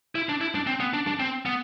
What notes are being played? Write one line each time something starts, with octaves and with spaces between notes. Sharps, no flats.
E4
D4
E4
D4
C4
B3
D4
D4
C4
B3